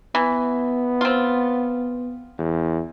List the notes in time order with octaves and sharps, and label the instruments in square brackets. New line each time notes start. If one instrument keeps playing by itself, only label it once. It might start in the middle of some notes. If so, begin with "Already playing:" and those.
[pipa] E3 [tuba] B3
[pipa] C4 F4
[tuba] E2